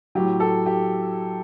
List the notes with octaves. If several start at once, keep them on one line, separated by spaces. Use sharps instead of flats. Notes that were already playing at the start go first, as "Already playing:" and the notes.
A2 F#3 G4
A4
G4